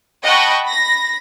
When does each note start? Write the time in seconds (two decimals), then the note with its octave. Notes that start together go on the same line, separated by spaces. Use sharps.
0.23 D#5 F#5 G5 A5 B5 C#6
0.65 B5 A#6